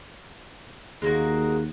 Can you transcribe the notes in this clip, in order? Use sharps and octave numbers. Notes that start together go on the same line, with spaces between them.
D#2 G#3 A#3 F#4